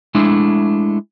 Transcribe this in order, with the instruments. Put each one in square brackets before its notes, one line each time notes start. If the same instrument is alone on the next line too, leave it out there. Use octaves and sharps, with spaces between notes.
[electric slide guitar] G#3 A3 D4 E4